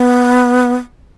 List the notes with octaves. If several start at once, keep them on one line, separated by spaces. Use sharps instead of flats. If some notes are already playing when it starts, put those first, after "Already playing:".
Already playing: B3